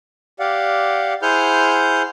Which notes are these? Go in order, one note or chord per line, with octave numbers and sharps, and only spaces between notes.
G4 D5 F5 F#5
E4 G#4 C5 F#5 F6 G6